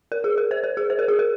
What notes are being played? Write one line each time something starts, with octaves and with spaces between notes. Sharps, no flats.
A#4
G#4
A#4
C5
A#4
G#4
C5
A#4
G#4
A#4